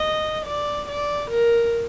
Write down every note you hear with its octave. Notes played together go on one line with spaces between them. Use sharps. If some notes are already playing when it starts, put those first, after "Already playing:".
Already playing: D#5
D5
D5
A#4